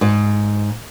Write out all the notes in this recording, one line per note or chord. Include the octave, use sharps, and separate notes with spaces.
G#2